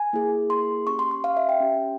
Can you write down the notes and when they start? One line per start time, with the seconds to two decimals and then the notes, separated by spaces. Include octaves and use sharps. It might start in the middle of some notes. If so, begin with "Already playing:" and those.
Already playing: G#5
0.13 A#3 E4 G#4
0.50 C6
0.87 C#4 G4 C#6
0.99 C6
1.11 C6
1.24 F5
1.37 E5
1.49 G5
1.60 C#4 G4